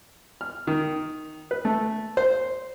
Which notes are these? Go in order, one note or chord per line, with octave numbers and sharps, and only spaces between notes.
F6
D#3
B4
A3
C5